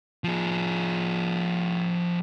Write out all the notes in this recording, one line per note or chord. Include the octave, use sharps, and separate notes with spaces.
F3 G#4